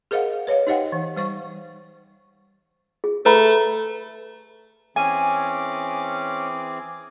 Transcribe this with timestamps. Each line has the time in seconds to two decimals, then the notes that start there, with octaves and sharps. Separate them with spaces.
0.11 G#4 A#4 C5 D#5 F5 F#5
0.47 B4 C#5 D#5 F5
0.67 D#4 G4 C5 D#5 F#5 G5
0.92 E3
1.16 G3 C5 C#6
3.04 G#4
3.26 A3 B4 A#5 B5
4.96 E3 C4 C#4 G#4 G#5 D6